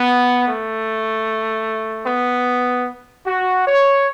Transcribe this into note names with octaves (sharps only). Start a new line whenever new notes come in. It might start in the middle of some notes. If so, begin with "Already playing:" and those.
Already playing: B3
A3
B3
F#4
C#5